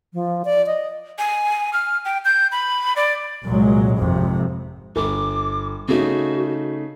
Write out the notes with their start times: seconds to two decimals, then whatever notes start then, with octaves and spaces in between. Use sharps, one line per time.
0.14 F3
0.45 D5
0.66 D#5
1.19 G#5
1.73 F6
2.05 G5
2.25 G6
2.52 B5
2.96 D5
3.45 C2 A#2 F#3 G#3
3.96 G#1 F2 C3
4.96 G1 D6
5.88 C#3 A3 D#4 F#4